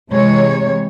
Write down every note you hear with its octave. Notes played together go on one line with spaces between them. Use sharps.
C3 E3 G#3 C#5